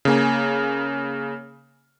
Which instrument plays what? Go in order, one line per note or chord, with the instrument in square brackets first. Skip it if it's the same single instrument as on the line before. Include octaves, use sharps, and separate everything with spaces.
[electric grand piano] C#3 A#3 G#5